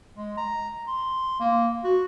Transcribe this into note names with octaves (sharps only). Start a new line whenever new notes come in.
G#3
A#5
C6
A#3
F#4